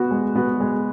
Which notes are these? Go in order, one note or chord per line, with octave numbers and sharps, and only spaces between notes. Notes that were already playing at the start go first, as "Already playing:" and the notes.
Already playing: B3 F#4
G#3
B3 F#4
G#3